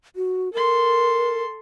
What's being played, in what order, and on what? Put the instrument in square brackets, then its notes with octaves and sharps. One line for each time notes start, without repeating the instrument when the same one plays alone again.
[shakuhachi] F#4
[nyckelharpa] A4 C6 [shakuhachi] A#4